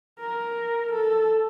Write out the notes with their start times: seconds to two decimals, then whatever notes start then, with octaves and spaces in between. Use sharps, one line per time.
0.20 A#4
0.92 A4